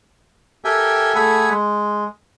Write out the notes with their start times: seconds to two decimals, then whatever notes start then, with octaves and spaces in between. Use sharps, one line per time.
0.65 G4 A4 A#4 E5 G5 G#5
1.15 A3 G#4 A4 F#5 G#5 B5
1.50 G#3